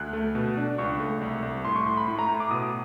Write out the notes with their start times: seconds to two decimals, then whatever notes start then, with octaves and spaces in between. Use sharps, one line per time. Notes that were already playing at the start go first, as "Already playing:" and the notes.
Already playing: D2 F#6
0.13 A3
0.35 B2
0.57 D4
0.78 C#2 C#6
1.00 A3
1.21 C2
1.42 C2
1.65 A2 C6
1.76 C#6
1.86 A2 C6
1.97 B5
2.08 A2
2.19 A#5
2.28 A2
2.40 D6
2.51 B2 D#6